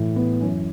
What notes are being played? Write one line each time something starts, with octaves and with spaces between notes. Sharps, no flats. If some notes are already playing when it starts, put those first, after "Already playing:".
Already playing: A2 E3
B3
F#2 E3 C#4